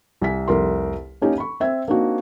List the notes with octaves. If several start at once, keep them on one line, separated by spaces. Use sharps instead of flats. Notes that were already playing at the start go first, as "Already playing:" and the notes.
C2 G#5 B6
F1 C2 A#4 C6
A#3 C#4 D#4 G4
B5 C#6
C4 E5 G#6
A#3 C4 D4 D#4 F#4